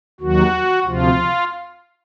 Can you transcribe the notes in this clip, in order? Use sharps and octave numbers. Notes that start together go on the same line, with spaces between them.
D#2 D#3 F#3 F#4
D2 C3 F3 F4